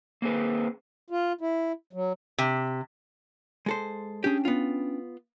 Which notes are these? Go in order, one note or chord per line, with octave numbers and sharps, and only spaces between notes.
A#3 C4 G#4 B4
F4
E4
F#3
C3
G#3 A4 C5
C#4 D4 G4 G#4 G5
B3 F4